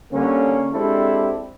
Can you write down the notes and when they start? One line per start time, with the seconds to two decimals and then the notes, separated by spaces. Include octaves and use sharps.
0.13 D3 G3 A#3 C#4
0.72 G#3 C4 D4 E4 G4 A4